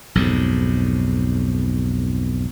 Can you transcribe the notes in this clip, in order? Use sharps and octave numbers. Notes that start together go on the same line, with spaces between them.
B1 F2 G#2